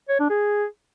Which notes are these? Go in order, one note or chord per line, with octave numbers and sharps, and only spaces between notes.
C#5
D4
G#4